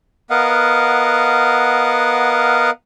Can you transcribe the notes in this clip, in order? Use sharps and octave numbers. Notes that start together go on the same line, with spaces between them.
B3 A#4 D#5 F5 F#5